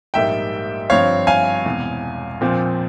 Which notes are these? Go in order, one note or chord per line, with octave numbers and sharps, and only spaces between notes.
A#1 G#2 G3 A#3 E5 G5
G1 G2 F3 C4 C#5 F5
F5 G#5
E1 E2 C3
A#1 A#2 F3 C4